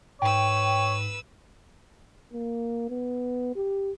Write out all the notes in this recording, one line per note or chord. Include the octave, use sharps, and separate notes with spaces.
G#2 B4 C#5 G5 E6
A#3
B3
G4